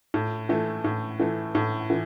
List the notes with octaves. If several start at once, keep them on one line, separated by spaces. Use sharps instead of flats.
A2
E3 A3
A2
E3 A3
A2
E3